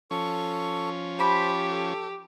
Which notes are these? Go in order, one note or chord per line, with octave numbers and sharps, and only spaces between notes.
F3 C#4 A4 C#6
G4 C5 A5 B5 D6
A4